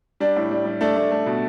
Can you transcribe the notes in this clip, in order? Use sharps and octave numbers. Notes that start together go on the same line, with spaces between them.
G3 D4
A2
G3
G3
A3 D4
A3
A3
B2